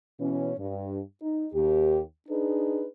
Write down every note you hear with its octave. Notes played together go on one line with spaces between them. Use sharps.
B2 E3 C#4
G2
D#4
D#2 G4
D4 D#4 G#4 B4